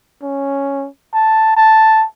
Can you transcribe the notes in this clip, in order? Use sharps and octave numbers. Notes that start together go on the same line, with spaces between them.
C#4
A5
A5